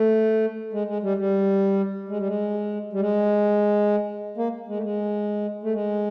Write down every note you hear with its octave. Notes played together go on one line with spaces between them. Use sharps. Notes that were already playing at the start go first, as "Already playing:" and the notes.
Already playing: A3
G#3
G#3
G3
G3
G#3
G3
G#3
G3
G#3
A#3
G#3
A3
G#3
A3
G#3